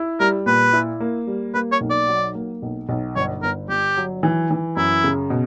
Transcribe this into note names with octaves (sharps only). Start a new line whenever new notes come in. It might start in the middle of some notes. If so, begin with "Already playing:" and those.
Already playing: E4
G3 A#4
A#2 B4
E4
A#3
G3
A#3 B4
C#5
B1
D5
F#3
A#3
B1
B1
G1 C#5
G1 A#4
G1 G4
F#3
E3
E3
F#2 E4
C#3
B2